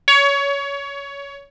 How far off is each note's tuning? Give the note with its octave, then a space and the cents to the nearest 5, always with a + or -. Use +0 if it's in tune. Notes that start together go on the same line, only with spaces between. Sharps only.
C#5 +20